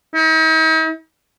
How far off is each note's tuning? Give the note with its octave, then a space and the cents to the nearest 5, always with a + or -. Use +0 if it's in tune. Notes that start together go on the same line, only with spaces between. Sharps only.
D#4 +45